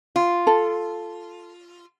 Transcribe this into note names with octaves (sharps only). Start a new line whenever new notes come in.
F4
A4